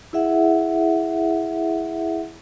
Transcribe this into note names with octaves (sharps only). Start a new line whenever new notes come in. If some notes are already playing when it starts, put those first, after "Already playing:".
E4 G#4 E5 F#5